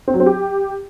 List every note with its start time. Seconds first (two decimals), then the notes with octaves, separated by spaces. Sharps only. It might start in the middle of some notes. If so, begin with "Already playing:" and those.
0.08 C4
0.14 F#3
0.20 C4
0.26 G4